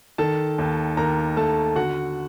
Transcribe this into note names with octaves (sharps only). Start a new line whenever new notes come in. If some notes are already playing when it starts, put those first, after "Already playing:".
D#3 A4 A5
D#2
D#2 A#4 A#5
A3 A4 A5
D3 F#4 F#5